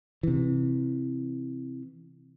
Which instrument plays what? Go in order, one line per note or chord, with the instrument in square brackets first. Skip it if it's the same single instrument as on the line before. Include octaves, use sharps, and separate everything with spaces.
[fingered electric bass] C3 E3